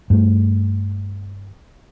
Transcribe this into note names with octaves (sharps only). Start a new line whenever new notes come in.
G2 A3